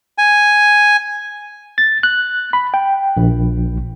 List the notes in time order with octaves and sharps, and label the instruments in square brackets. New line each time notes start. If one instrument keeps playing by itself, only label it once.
[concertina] G#5
[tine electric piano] A6
F#6
B5
G5
A#1